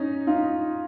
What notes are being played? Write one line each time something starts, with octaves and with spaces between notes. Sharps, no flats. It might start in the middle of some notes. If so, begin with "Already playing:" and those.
Already playing: C#4 D#4
D#4 F4